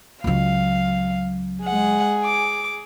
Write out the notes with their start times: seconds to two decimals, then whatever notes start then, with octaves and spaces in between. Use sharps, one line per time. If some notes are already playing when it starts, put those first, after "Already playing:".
0.24 C#2 F#3 F5
1.64 G#3 G#4 F#5
2.24 D6